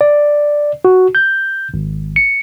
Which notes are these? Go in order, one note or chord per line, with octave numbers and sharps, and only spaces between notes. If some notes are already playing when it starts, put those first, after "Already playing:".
D5
F#4
G6
G#1
C#7